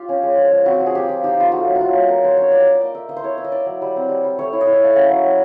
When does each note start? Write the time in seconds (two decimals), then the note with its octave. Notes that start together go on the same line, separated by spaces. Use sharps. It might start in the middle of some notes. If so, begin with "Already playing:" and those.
Already playing: F4 G4
0.09 C#4
0.23 G#3
0.37 F3
0.51 F3
0.66 C4 F#4
0.80 F3
0.86 G#4
0.95 A#3 G4
1.09 F3
1.24 D#4 G4
1.38 A#3 F4
1.52 A3 F#4
1.67 F#3
1.75 F#4
1.81 A3 F4
1.95 F#3
2.09 A#3 A#4
2.24 A#3 C5
2.37 C#4 C#5
2.52 F4 D5
2.66 A#3 D5
2.81 A#3 D#5
2.95 A#3 E5
3.09 A#3 D#5
3.17 C5
3.24 E4 C#5
3.38 E4 E5
3.45 D#5
3.52 E4 D5
3.66 F#3
3.82 G3
3.96 C4
4.09 G3
4.24 G3
4.39 A3 C#5
4.53 E4
4.61 D#5
4.67 E4
4.73 E5
4.81 A3 F5
4.96 C#4 F#5
5.10 F#3
5.24 F#3